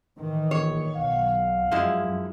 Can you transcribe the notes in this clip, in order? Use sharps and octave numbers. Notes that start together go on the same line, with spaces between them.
A2 D#3 E3
A#1 C#5
B1 F5 F#5
F#2 F3 G#3 E4